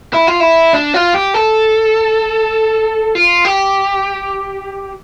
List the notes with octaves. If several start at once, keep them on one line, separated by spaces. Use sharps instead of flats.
E4
F4
E4
D4
F4
G4
A4
F4
G4